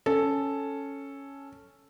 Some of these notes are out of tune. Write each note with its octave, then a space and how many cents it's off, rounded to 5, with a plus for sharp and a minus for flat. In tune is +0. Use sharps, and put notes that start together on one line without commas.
C#4 +0 A4 +0